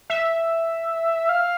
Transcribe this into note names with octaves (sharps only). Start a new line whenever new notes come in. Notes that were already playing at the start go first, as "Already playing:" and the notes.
E5
F5